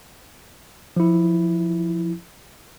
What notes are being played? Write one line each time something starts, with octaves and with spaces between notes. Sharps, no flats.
F3 E4